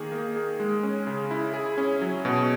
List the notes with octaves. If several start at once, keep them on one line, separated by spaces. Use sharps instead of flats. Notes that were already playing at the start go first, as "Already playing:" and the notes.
Already playing: D#3 A#3 G#4
A#3
G#4
G#3
C#4
C#3
E4
G#4
C#4
F#3
B2